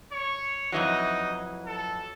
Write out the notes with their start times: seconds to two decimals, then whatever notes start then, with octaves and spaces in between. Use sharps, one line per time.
0.12 C#5
0.72 F2 E3 F#3 D#4
1.67 A4